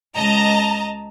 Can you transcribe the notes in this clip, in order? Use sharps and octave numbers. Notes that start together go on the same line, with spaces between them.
C#2 D#5 A5 A#5